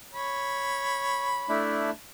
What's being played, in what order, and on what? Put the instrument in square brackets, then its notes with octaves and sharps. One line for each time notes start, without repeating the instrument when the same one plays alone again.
[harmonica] C#5 B5
[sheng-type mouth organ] A3 D4 E4